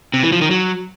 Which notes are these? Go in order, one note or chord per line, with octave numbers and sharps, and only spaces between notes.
C3
E3
F3
D#3
F#3